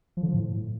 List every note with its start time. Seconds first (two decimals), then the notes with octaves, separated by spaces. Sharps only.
0.17 F3
0.23 D3
0.28 F3
0.34 A2